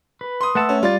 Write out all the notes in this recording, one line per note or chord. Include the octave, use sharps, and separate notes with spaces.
B4
C6 D#6
A3 B4 E5 F#5 A5 E6
C#4
G3 F4 D5 A6